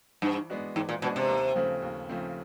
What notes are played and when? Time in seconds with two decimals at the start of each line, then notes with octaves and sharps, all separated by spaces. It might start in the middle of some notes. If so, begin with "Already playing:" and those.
0.22 G2 E3
0.50 G#3 B3 D4 F#4
0.76 G#2 E3
0.89 A#2
1.02 B2 G#3 B3 D4 F#4
1.16 C3
1.29 D#2
1.56 C#3 F3 A3 C4
1.82 D#2
2.09 C#3 F3 A3 C4